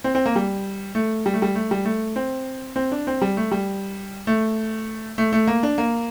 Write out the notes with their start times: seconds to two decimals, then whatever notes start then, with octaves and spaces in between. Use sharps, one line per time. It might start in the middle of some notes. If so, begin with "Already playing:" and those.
0.04 C4
0.15 C4
0.26 A#3
0.36 G3
0.95 A3
1.26 G3
1.33 A3
1.42 G3
1.55 A3
1.71 G3
1.85 A3
2.16 C4
2.76 C4
2.92 D4
3.07 C4
3.22 G3
3.37 A3
3.51 G3
4.27 A3
5.18 A3
5.33 A3
5.47 A#3
5.63 D4
5.78 A#3